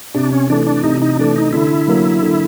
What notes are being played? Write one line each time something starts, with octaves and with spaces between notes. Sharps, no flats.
C3 D4
C#4
E3 A3 D4
D4
C3 D#4
D#4
E3 A3 D4
D#4
D3 E4
F#3 A#3
D3